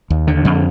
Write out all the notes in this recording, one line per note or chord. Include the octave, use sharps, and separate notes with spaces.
D#2
D3
F2